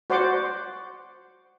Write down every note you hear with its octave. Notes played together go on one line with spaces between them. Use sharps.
F#4 C5 D5 F#5 C6 D6